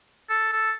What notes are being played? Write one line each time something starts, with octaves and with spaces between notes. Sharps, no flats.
A4
A4